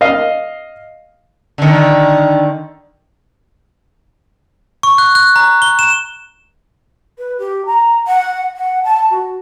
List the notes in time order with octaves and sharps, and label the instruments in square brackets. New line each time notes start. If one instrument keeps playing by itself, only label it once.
[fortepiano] D#5 F5
[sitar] D3 D#3
[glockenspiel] C#6
F#6
F#6
A#5
G7
E7
[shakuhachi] B4
G4
A#5
F#5
F#5
A5
F#4